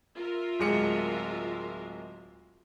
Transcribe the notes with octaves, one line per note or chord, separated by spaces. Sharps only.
F4 A#4 E5
D1 G#3 C#7